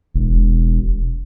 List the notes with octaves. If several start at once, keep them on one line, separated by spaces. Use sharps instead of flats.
E1